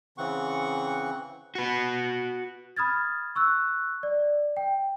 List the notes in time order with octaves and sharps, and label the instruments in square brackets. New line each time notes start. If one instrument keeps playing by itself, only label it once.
[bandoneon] C#3 E3 C4 F#5 C#6
[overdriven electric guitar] F#4 B4
[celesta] B5 D#6 F6 G#6 A6
C#6 E6 F#6
D5
G5